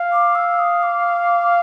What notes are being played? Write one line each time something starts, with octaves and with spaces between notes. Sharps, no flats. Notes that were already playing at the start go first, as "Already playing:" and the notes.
Already playing: F5
D6
E6
D#6
D6